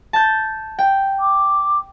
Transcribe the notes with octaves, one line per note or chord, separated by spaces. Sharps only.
A5 G6
G5
D6